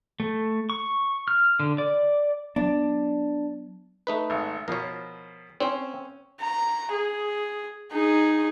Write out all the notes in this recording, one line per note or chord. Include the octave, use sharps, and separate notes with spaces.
A3
C#6
F6
D3
D5
F#3 B3 D4
A3 D#4 B4
G#1
B2 F3 A#4 C#5
C4 C#4 C5
A#5
G#4
D#4 G#4